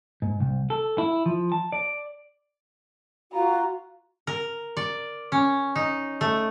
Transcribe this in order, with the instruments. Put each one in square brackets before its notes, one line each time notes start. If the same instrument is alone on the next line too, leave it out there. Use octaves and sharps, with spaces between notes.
[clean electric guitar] G#2
C2
A4
E4
F3
A5
D5
[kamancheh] F4 A#5 [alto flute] F#4
[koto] A#4
D5
C#4
D#4
A3